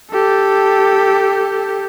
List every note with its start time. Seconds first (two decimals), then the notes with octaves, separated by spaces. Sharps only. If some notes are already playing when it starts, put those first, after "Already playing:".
0.11 G4 A4